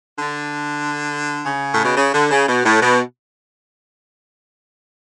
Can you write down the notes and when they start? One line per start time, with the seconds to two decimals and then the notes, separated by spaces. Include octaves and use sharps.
0.18 D3
1.46 C#3
1.73 A2
1.85 B2
1.97 C#3
2.14 D3
2.31 C#3
2.47 B2
2.65 A2
2.82 B2